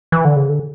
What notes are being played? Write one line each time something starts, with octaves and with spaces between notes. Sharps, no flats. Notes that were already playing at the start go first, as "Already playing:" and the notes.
E3
D3
C#3
D3